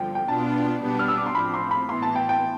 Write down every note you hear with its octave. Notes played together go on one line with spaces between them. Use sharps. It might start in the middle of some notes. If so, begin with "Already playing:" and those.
Already playing: G1 G2 D3 F3 G5
G5
B2 B3 D4 F4 A5
B1 B2 G3 B3 D4
F6
E6
D6
C6
A1 A2 F3 C4 B5
C6
B5
A2 E3 B3 E4 C6
A5
G5
G5